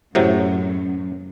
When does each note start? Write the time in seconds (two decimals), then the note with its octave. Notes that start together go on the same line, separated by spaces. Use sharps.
0.15 F#2 A2 C3 F#3